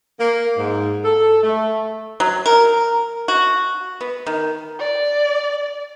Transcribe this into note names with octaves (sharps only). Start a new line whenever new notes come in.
A#3
G#2
A4
A3
F#3
A#4
F#4
B3
D#3
D5